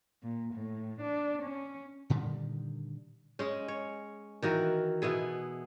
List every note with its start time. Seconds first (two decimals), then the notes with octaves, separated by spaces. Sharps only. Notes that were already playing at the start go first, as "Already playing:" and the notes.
0.22 A#2
0.54 A2
0.99 D4
1.42 C#4
2.10 A#2 D3 D#3 G3
3.39 G#3 C#4
3.68 C#5
4.42 D#3 E3 F#4 A#4
5.02 B2 B3 E4 G#4